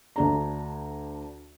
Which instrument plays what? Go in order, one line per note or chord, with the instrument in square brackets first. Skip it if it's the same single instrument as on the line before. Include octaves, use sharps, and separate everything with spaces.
[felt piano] D2 D4 A#5